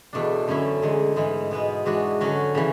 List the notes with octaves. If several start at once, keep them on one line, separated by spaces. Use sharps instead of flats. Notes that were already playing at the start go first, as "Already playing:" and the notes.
E2 B2 A3 D4
F#2 D3 A3 C#4 E4
E2 D3 G#3
G#2 E3 G#3
B2 G#3 B3
E3 G#3 D4 F#4
D3 F#3 C#4 F#4
C#3 E3